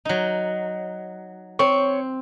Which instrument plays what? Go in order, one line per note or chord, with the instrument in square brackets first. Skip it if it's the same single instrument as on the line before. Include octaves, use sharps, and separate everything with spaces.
[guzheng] F#3 D#4
[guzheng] C4 [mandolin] C#5